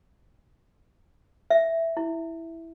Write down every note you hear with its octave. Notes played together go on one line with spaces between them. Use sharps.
E5
E4